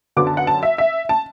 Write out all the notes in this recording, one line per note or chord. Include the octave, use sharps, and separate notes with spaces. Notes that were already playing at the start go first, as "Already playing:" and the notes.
F#2 D3 F#3 B3 D6
A5
F#5
A5
E5
E5
A5